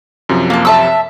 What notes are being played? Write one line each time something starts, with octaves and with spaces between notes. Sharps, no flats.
F#2 C3 F3
A#3 A5
E5 A5 E6